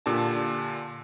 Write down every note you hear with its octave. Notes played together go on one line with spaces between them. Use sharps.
A#2 D3 D4 G4 A5